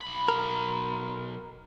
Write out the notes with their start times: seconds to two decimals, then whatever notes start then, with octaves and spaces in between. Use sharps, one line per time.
0.01 B1 B5
0.28 A#4